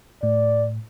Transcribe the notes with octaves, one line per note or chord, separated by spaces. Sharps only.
A2 D5